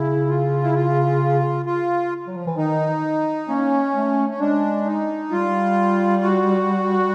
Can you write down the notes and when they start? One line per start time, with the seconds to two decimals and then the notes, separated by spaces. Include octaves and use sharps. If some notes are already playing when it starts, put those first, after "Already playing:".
Already playing: C#3 E4
0.29 F4
0.63 E4
0.75 F4
1.66 F4
2.27 F#3
2.37 F3
2.47 E3
2.57 D#3 D#4
3.48 A#3 C#4
3.95 A3
4.29 C#4
4.40 G#3 D4
4.85 D#4
5.31 G3 F4
6.23 F#4